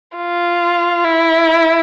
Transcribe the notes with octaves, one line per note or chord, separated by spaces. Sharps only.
F4
E4